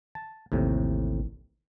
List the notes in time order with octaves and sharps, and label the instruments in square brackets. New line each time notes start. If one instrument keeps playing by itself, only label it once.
[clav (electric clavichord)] A5
[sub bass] A1 [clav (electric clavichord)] D#2 A2 C3